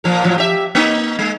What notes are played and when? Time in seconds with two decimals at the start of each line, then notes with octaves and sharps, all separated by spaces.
0.04 A#2 F3 A#4
0.24 A2 F3 F#3
0.38 G4 E5
0.75 A#3 D#4
1.19 G#3